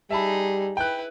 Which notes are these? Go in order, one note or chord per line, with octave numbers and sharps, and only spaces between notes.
G3 D#4 G#4 E5 A5 B5
E4 B4 G5 F#6